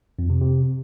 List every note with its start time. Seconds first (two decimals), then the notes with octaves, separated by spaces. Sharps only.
0.19 F2
0.30 C3
0.41 C3